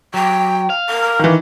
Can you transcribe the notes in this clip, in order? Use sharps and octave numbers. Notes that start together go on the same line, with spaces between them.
F#3 G5
F5
A#4
D#3 E3